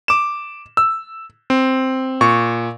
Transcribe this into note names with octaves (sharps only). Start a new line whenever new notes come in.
D6 E7
E6
C4
A#2 C#6